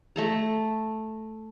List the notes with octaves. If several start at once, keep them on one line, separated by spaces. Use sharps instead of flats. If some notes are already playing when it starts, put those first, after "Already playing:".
A3 A4 A#5